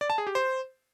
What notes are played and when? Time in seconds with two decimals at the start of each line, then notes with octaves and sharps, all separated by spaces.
0.01 D5
0.10 A5
0.18 G#4
0.27 G4
0.35 C5